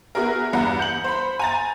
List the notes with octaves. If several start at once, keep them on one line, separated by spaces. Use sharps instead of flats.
B3 E4 F#4 G#4 A#4
E2 G2 E4 F#5 A#5
G6 C#7 F#7
C5 B5
G#5 A#5 A6